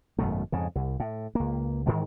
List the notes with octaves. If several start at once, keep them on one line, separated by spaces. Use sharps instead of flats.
G#1 F#2 B2 A3
F2 G#2 C#3
C2
A2
C#2 A#3
G#2 D#3 E3 G#3